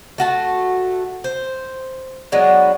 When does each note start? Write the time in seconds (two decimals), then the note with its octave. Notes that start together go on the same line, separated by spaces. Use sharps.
0.18 A3 F#4 A5
1.24 C5
2.32 F#3 G#3 B3 D4